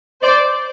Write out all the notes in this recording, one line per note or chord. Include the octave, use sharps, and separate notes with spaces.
C5 D5